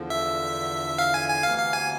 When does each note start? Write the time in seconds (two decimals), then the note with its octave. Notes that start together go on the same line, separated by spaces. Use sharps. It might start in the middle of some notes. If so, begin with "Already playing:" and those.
Already playing: E2 D3 F3
0.10 E5
0.98 F5
1.14 G#5
1.28 G#5
1.43 D2 C3 E3 B3 F5
1.58 F5
1.73 G#5